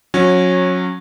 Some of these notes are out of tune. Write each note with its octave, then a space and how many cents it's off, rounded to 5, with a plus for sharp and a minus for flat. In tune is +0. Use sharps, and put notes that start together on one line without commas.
F#3 -30 C#4 -20